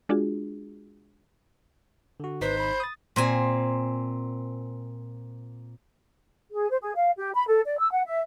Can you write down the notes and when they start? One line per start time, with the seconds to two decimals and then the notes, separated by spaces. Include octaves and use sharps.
0.09 G#3 D4 F4 F#4 G#4
2.20 D3 F#4
2.41 G#1 D#4 B4 C5 B6
2.58 B5
2.80 D#6 A6
3.16 A#2 C4 G#5
6.52 G#4
6.69 C5
6.81 G#4
6.95 F5
7.17 G4
7.34 B5
7.47 A4
7.66 D5
7.79 E6
7.91 F#5
8.06 E5